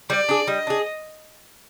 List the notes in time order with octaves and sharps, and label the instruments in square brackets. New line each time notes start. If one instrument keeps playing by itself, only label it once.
[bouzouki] G3 [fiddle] D5
[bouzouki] D4 G#4
[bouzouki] G3 [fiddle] D#5
[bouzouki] D4 G#4